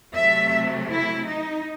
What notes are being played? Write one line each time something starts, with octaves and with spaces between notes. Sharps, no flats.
C3 F#3 A3 E5
E4
D#4